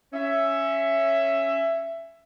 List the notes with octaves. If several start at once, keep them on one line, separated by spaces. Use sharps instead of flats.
C#4 E5